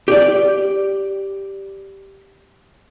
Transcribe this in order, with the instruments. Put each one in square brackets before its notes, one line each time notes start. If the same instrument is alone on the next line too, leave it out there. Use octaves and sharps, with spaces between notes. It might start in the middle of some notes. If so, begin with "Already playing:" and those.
[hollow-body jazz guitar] G4 D5